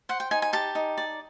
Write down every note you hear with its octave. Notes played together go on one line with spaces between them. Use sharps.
C5 F#5
G5
D#4 G#5
G#5
G4 A5
D#4
D5